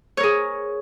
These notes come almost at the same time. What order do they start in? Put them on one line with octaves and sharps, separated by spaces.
C#5 A#4 G#4